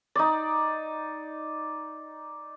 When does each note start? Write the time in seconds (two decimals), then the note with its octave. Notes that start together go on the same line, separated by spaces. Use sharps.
0.15 D#4 D5